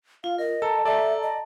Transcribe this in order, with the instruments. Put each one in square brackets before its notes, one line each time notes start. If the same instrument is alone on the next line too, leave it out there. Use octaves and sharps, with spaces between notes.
[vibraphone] F4 [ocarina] F5
[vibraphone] A#4 [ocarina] D#5
[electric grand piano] A4 [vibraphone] A5 A#5
[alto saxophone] A4 [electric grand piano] D5 [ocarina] E5
[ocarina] D#5